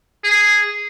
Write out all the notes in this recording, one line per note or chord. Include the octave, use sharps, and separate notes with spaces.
G#4